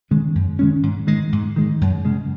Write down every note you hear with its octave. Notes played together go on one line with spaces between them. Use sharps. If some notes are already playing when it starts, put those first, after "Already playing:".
D#3 G#3 C#4
F#2
D#3 G#3 C#4
G#2
D#3 G#3
G#2
D#3 G#3
F#2
C#3 G#3